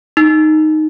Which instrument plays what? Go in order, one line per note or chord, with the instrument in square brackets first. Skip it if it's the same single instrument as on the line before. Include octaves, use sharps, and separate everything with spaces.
[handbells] D#4